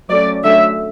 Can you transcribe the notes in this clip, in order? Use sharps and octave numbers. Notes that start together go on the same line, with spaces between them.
F#3 A3 C#4 D5
D3 F#3 A3 C#4 E5